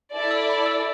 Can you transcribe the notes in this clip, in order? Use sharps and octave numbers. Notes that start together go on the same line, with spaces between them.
E4 A4 D5
E6
B5
E6